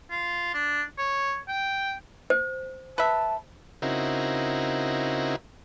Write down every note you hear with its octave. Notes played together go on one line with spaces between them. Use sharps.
F4
D4
C#5
G5
C5
B4 E5 A5
C#3 C4 D#4 E4 F#4 A#4